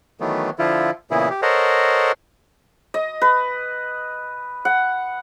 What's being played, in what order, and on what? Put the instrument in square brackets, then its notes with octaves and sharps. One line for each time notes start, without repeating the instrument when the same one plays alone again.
[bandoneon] D#3 E3 F#3 A3 B3
D3 F3 E4 F4
A#2 C#3 E3 B3 E4 G#4
G4
A4 A#4 C5 C#5 D#5 F#5
[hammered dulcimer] D#5
B4
F#5